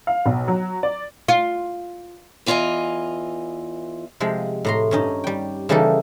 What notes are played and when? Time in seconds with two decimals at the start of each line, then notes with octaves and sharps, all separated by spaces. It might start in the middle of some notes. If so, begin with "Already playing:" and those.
0.07 F5
0.26 B1
0.48 F#3
0.83 D5
1.28 F4
2.46 E2 E3 F4 B4 D#5 G#5
4.20 C3 F3 G#3
4.65 A2 A#5 C6
4.91 G2 C#4 D#4
5.24 G3 G5
5.69 C#3 E3 G3 A#3 D#4 A4